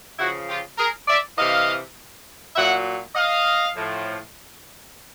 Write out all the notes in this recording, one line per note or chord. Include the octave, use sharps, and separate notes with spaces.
C#3 F3 E4 F#4
F4 G4
G#4 A#4
D5 E5
C3 E3 D#5 F5
A#2 F#3 E5 F#5
D#5 F5
A2 F3